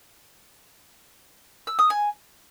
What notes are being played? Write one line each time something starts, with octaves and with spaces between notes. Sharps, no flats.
E6
D#6
G#5